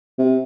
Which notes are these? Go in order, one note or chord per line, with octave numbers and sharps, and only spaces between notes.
C3